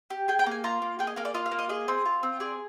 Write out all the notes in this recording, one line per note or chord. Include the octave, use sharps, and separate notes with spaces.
G4
G#4 G5
G5
A#3 G#5
F4 A#5
A#3
G#4 G5
D#5
A#3 F5
D5
F4 D#5
F5
A#3
D#5
G#4 D#5
C4
F4
C4
G#4 D5